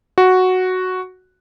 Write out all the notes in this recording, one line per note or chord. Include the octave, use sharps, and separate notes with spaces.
F#4